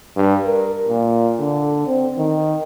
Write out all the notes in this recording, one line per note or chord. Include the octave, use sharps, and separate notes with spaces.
G2
A#4
A#2
D3
C4
D#3